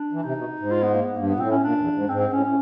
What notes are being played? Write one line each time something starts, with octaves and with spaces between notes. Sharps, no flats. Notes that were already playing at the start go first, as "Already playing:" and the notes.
Already playing: D4
E3
C3 D#4
B2
G#2
F4
B3
A#3
B3
G2 A#3
B3
A#2
A2 C4
C#4
A#2 D4
E2
G#2
G#2 C4
C4
A2 C#4
A2 C#4